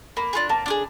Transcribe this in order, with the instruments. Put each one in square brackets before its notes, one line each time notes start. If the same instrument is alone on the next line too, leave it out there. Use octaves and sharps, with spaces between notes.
[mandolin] A#3 [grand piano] B5
[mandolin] D4 F4 G#4
[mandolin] A#3 [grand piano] A5
[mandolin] D4 F4 G#4